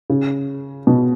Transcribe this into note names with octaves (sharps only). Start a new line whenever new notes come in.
C#3
B2